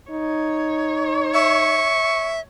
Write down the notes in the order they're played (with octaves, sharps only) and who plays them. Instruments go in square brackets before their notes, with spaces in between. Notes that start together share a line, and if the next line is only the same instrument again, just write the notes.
[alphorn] D#4 [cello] C#5
[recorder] E5 [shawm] C#6